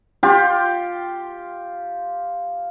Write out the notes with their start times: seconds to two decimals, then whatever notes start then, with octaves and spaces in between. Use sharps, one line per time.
0.23 F4 G4 G5 C6